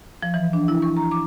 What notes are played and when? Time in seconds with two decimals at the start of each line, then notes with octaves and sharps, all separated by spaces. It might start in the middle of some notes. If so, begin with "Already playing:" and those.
0.22 F3
0.34 E3
0.53 D4
0.68 E4
0.82 C#6
0.97 A#5
1.11 D6